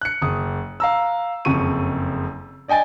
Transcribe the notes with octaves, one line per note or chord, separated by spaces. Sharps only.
F#6 C#7
F#1 D#6
F5 A#5 E6
F#1 F2 C#3 C#6 D#7
D5 D#5 G5 G#5 A6